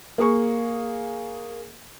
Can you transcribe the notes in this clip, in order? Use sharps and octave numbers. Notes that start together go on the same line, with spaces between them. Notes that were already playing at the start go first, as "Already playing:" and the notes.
A#3 G#4 C#6